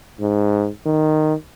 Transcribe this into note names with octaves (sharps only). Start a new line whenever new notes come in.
G#2
D#3